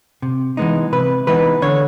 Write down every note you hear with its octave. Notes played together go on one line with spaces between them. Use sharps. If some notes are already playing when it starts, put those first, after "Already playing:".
C3
E3 G#3 B3 D#4
C3 B4
E3 G#3 B3 D#4 B4
D3 C#5